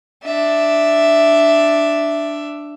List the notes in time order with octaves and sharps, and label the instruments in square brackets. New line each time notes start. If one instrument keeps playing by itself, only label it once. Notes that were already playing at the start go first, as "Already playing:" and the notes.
[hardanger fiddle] D4 E5